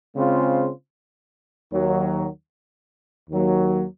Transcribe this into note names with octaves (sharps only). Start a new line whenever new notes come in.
C#3 G#3 C4 F4 C5
D#2 D#3 F#3
D#2 D#3 F#3 A#3